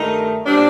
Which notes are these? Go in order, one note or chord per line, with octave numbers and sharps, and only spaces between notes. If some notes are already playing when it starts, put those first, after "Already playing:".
Already playing: G2 D#3 A3 D#4
A#2 G3 C4 D4